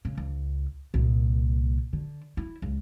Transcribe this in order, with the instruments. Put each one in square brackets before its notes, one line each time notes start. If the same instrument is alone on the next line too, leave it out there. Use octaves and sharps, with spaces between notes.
[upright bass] C#3
C#2
C2 A#2
D3
E4
C#2